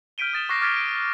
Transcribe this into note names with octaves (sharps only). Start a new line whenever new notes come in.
F6 G6 B6 D7 D#7 G7
D#6 A6 E7 G7
C#6 D6 F6 F#6 A#6 C7
D6 F6 G#6 A6 B6 D7
D7